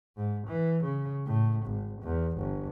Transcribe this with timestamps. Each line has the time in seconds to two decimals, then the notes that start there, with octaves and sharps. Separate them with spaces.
0.17 G#2
0.47 E3
0.84 C#3
1.26 A2
1.66 G#1
2.02 E2
2.38 G1